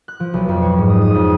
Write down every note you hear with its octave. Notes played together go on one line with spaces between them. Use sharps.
F#6
F3
B1
F2
C#5
G#2
D#6
D#6
F2